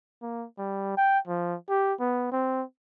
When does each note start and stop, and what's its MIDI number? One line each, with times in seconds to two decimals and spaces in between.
0.22 0.47 58
0.58 0.93 55
0.97 1.19 79
1.28 1.56 53
1.69 1.93 67
2.00 2.29 59
2.32 2.63 60